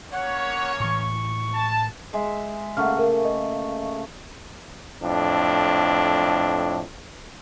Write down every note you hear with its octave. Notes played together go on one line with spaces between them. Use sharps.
A#3 C#4 C#5 F#5
A2 E3 C#6
A5
G#3 G#4 E5
C#3 A3 A#3 F#5 F6
A#4
D#5
F2 A2 D4